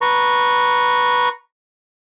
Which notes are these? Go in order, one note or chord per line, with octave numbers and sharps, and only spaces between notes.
B4 A#5 C#6